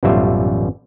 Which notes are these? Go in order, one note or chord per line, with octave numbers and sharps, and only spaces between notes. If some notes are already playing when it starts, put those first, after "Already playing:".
A1 F#2 B2 G3 F4 E5